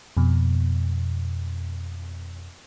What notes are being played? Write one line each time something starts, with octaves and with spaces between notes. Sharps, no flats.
F2 B2